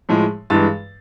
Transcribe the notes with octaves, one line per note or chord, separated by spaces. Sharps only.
A2 F3 G#3
G2 E3 G#3 A6